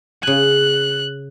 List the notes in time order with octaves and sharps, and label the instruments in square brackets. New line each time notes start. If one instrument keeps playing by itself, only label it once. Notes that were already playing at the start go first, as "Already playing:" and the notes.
[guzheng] C#3 G#5 [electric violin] F#6